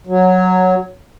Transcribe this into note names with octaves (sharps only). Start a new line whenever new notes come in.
F#3